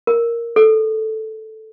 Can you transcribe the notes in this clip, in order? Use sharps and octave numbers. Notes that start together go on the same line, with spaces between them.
A#4
A4